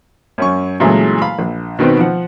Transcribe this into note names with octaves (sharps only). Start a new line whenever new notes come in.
F#2 C#4 C#6
A#2 C#3 E3 F#3 G#3 A3
F5 B5
A#1
B2 D#3 B3 C4
F3 F#5